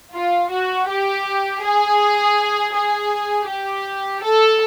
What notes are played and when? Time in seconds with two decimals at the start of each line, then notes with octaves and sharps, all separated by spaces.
0.14 F4
0.51 F#4
0.88 G4
1.62 G#4
2.75 G#4
3.49 G4
4.23 A4